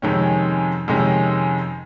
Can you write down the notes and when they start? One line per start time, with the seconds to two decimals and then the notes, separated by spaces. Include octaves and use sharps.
0.02 F2 C3 D#3 G#3 C#4
0.88 F2 C3 D#3 G#3 C#4